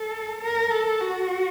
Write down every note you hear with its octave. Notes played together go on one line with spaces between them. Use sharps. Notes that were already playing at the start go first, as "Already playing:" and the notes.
Already playing: A4
A#4
A4
F#4